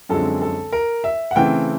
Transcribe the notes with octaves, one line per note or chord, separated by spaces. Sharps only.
F#2 D3 F3 G#3 C4 A4
A4
A#4
E5
F#5
C#3 E3 A3 C4 G5